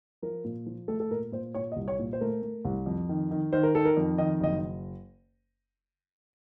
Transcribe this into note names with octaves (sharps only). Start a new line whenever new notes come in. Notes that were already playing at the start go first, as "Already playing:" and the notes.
F3 A#4
A#2
F3
A3 A4
A4
A#2 A#4
A#2 C5
A#2 C#5
D#5
C2
C#5
A#2
C5
A3 A#4
A3
C2
F2
D#3
D#3
D#3 C5
A#4
D#3 A4
A#4
F2
D#3 D#5
F#1 D#5